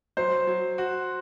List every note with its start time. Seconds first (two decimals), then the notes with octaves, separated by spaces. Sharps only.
0.17 F#3 C5
0.47 F#3
0.78 F#4